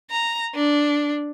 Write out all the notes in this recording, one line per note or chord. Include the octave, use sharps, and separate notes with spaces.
A#5
D4